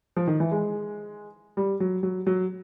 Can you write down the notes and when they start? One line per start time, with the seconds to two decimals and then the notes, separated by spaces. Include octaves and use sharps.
0.17 F3
0.27 D#3
0.40 E3
0.51 G#3
1.57 G3
1.80 F#3
2.03 F#3
2.27 F#3